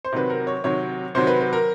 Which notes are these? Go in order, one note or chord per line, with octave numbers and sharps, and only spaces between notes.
C5
C3 D#3 F#3 B4
A#4
C#5
C3 D#3 F#3 C#5
C3 D#3 F#3 C5
B4
B4
A#4